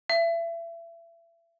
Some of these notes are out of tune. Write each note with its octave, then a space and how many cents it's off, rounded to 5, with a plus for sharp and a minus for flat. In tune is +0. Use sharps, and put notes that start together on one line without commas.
E5 +30